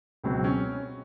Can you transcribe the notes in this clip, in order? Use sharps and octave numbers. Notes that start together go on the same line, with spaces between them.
C#2 B2 F#3 C4
C#4